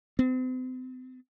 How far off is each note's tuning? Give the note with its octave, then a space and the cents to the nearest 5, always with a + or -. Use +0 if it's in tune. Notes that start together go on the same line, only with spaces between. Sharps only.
C4 -40